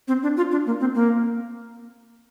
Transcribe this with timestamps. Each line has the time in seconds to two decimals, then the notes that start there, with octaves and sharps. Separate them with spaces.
0.08 C4
0.23 D4
0.37 F4
0.52 D4
0.66 A#3
0.80 C4
0.95 A#3